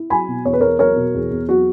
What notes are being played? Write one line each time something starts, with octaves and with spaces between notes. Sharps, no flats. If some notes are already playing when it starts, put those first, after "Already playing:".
Already playing: E4
F#3 G#5 B5
B2
E2 C#5
B4
E2 A#4 C#5
F#3 A#4 C#5
B2
E2
E2
F#3 F#4